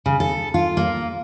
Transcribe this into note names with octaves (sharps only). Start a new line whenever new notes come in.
C#3
A4
F4
A#3